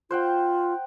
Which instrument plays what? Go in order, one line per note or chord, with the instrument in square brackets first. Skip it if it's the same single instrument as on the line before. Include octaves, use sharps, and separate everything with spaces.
[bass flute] F4 [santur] C5 F#5 G5